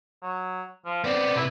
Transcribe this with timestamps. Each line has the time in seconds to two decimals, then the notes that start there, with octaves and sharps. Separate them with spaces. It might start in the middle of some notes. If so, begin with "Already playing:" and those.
0.22 F#3
0.86 F3
1.04 B3 C4 D5
1.36 C3 E4 B4